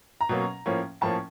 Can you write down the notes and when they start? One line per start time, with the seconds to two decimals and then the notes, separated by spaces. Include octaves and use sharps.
0.21 A#5
0.29 B2 F#3 A#3 C#4
0.66 A2 F3 A#3 C#4
1.01 A2 F3 A#3 C#4 A5